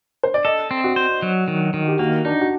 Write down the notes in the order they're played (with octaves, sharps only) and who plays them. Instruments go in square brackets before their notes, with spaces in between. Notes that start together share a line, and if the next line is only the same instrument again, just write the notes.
[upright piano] C5
D5
[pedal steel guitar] A4 [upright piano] D#5
[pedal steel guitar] C4
[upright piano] F#4
[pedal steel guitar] C5
F#3
D#3
D#3
[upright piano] G4
[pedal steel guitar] A#3 [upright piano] F#4
[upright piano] D4 [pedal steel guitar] D#4
[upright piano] F#4